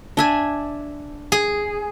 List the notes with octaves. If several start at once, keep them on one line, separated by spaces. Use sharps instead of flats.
D4 E5 G#5
G#4